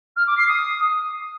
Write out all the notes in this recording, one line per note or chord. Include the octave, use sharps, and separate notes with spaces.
F6
D6
C7
D#6